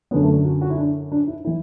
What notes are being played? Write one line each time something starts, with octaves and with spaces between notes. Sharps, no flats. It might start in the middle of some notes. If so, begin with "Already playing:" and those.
F#2 D3 B3
A3
D4
F#4
F#4
E4
D4
D4
E4
E3 E4